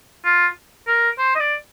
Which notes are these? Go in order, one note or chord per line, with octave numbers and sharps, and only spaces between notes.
F4
A#4
C5
D#5
D5